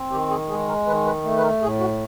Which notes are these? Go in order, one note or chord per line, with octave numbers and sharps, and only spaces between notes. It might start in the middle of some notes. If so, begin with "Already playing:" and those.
Already playing: C4
D#3 G4
G#4
G#3 G#4
A#4
D#3 B4
B4
A3
B4
A#4
A2 G#4
F#4